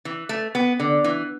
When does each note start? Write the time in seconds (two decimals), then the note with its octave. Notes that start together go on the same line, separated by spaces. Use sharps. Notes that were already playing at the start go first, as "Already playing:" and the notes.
0.05 E3
0.29 A3
0.55 B3
0.80 D3
1.04 E3